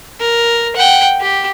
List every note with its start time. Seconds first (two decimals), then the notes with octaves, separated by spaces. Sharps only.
0.20 A#4
0.76 F#5 G5
1.21 G4